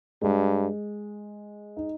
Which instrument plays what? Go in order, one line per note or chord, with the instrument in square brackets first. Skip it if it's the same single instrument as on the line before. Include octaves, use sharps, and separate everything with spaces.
[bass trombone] G2 [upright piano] G#3
[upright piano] D#4